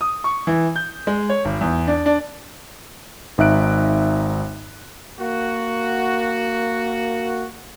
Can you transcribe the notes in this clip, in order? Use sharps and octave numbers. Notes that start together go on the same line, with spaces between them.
D#6
C#6
E3
G6
G#3
C#5
G#1
E2
D4
D4
G#1 D#4 E5 F#6 D7
A#3 F#4